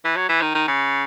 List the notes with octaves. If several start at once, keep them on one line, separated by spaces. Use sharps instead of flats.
E3
F#3
E3
D#3
D#3
C#3